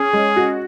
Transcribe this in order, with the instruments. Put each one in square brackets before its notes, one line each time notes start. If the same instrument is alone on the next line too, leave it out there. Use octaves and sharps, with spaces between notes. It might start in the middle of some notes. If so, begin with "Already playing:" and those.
Already playing: [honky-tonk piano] C#4 [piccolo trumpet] G#4
[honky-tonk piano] G#3
F#4